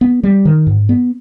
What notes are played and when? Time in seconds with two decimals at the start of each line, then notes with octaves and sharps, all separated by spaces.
0.01 B3
0.23 G3
0.45 D#3
0.67 G#2
0.89 B3